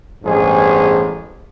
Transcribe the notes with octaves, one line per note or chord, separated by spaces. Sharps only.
A1 E2 G2 G#3 G#4 C5